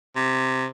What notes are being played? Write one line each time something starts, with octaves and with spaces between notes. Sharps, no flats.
C3